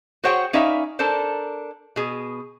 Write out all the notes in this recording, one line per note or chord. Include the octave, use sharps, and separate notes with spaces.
F#4 G#4 C5 C#5 F#5 G5
C#4 D#4 B4 D5 E5 F5
D4 A4 A#4 C5
B2 G#4